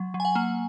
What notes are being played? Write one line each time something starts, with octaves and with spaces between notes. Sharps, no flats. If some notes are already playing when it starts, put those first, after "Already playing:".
Already playing: F#3
F#3
G#5
F#5
A#3